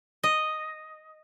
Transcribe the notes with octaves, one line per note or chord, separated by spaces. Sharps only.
D#5